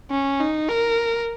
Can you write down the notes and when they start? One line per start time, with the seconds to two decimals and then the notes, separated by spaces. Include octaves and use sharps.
0.11 C#4
0.40 D#4
0.68 A#4